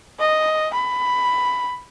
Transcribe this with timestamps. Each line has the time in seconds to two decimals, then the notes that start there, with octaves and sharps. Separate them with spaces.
0.20 D#5
0.74 B5